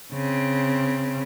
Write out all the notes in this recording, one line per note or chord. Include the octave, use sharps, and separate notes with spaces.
C#3 C4